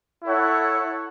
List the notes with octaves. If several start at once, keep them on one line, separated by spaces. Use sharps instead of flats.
E4 A4 C#5 F#5